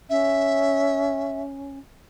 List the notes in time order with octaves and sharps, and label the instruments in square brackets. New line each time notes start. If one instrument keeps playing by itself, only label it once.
[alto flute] C#4 [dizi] E5